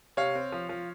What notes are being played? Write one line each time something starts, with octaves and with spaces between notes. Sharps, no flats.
C3 C#5 F5
C4
F3
F3